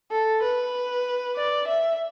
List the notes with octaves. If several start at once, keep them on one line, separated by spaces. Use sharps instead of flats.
A4
B4
D5
E5